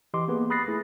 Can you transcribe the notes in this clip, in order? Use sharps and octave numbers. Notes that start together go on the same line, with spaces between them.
E3 G4 D#5 C6 D6
A#3 B3 G#4 B4
B5 D#6 F#6 A6 A#6 C7
A3 E4 G#4